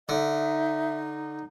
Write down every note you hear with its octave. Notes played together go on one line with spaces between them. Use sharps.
D3 D#4 E5